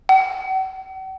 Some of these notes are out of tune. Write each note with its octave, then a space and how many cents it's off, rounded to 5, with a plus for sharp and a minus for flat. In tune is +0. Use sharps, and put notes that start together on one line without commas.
F#5 +45